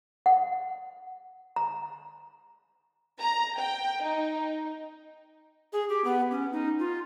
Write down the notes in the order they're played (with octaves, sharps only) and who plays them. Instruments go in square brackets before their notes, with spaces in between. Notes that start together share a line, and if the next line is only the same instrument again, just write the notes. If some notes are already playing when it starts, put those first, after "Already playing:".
[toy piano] F#5
A#5
[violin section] A#5
G5
D#4
[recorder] G#4
G4
B3
C#4
D#4
F4